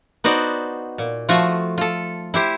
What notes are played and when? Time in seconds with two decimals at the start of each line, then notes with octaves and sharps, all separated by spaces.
0.24 B3 D#4 F#4 C5 D5
0.98 A#2
1.29 F3 A3 F4 F#4
1.78 F4 A4
2.34 E4 G4 C5